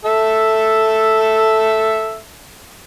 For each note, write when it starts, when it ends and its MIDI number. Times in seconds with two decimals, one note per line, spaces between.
0.05 2.18 69
0.05 2.18 76